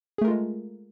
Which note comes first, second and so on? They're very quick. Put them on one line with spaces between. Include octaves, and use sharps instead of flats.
G#4 A3 A#4 F4 G#3